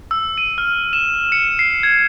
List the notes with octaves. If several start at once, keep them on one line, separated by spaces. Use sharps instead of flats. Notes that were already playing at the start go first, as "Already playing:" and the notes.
E6
D#7
F6
E7
C#7
C7
G#6